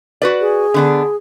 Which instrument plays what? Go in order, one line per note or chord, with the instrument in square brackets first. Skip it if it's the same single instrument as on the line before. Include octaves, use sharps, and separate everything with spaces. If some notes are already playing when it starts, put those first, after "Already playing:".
[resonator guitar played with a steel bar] F#4 B4 D5
[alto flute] G#4
[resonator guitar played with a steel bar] D3 B3 D4